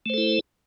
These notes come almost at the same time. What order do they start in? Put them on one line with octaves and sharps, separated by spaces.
A3 C5 A4 E4